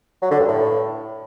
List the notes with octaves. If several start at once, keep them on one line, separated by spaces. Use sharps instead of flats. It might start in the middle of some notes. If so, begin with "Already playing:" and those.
F#3
D3
G2
A2